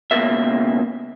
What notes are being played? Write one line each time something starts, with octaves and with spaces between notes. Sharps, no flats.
C#2 B2 A#3 E5